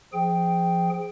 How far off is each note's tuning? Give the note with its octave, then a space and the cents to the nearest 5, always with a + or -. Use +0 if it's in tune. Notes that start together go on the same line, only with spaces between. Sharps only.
F3 -5 G#4 +0 G5 +0